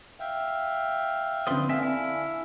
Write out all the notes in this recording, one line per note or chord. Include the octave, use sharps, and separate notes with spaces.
E5 F5 G5
D3 B3 C4 B4 C6 D#6
D3 C4 E5 F5 G#5
E4